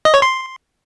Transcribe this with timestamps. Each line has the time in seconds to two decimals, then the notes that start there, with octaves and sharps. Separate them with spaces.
0.05 D#5
0.14 C#5
0.22 C6